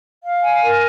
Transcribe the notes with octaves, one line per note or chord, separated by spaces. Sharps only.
F5
G#5
A#4